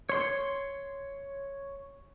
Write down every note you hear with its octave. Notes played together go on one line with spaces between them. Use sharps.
C#5 C6